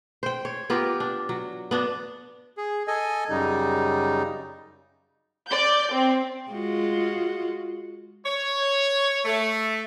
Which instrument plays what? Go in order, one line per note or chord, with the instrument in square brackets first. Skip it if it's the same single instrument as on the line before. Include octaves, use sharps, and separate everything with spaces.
[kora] C5 G5
C#5
B3 F4 G4 A#4
D4
F#3
B3 D4 F#4
[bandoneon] G#4
A4 D#5 G#5
F#2 C#3 G3 D#4
[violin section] D5 G6
C4
[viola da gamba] G#3 F4 F#4
[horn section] C#5
A3